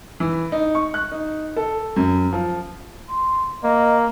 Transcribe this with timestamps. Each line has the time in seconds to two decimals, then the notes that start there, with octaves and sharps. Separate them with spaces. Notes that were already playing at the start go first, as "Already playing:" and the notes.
0.20 E3
0.52 D#4
0.75 C#6
0.94 F#6
1.12 D#4
1.56 A4
1.96 F#2
2.33 F3
3.09 C6
3.63 A#3 D#5